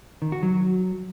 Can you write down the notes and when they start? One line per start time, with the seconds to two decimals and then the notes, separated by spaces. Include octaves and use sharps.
0.22 D#3
0.32 F#4
0.43 F#3